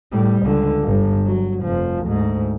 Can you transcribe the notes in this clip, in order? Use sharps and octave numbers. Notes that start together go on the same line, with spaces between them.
A2 G3
C#2 D3
G1 G2
F#3
F1 F3
D2 G#2